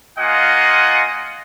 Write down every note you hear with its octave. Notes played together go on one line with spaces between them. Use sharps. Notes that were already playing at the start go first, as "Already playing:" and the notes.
A#3 F4 D#5 F#5 G#5